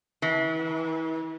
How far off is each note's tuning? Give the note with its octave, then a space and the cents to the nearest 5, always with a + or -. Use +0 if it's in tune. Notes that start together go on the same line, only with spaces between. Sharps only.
E3 -35